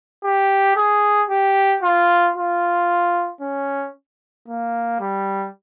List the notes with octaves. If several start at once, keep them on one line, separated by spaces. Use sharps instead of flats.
G4
G#4
G4
F4
F4
C#4
A#3
G3